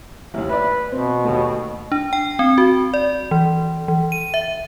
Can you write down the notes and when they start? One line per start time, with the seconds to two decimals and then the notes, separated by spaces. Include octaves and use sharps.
0.34 A1 D#2
0.49 B4 D5 E5
0.92 B2 C4
1.24 D#2 A3
1.92 D4
2.13 G5
2.39 C4
2.58 F#4
2.94 D5
3.31 E3
3.88 E3
4.12 D#7
4.34 E5